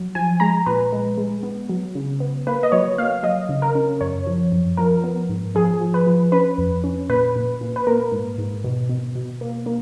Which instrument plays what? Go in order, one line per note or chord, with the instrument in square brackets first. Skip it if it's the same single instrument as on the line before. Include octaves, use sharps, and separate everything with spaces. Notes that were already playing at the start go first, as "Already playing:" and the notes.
Already playing: [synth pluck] F#3
F3 G#5
G#3 A#5
A#2 B4
G#3
G#3
B3
F#3
C#3
B3
A#3 B4
D#5
F#3 C#5
A#3 F5
F#3 D#5
C#3
A#4
C#4
F#2 C#5
F3
F#2
F3 A#4
B3
G#2
F3 G#4
F3
B4
F3
C#4 B4
F2
C#4
A#2 B4
A#2
A#2
B4
A#3 A#4
G#2
G#2
B2
B2
B2
A#3
A#3